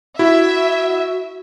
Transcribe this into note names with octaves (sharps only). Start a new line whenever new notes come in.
E4 F#4 E5